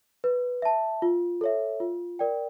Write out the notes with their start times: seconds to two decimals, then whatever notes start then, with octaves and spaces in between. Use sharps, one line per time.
0.24 B4
0.62 E5 A5
1.02 F4
1.41 A4 C#5 E5
1.80 F4
2.19 A#4 D5 G5